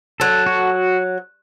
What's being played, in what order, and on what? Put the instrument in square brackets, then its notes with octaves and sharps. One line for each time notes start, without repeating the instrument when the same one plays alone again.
[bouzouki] F#3 [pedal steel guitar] A4
[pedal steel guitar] F#4